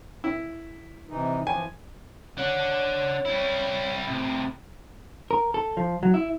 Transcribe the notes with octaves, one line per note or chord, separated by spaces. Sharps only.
E4
C3 E3 D#4
E3 F3 G#5
D4 C#5 F#5
G3 E4
A2 C3
A#4
A4
F3
F#3
E4